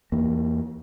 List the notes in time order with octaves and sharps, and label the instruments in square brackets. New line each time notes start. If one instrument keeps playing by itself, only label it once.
[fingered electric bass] E2 A#3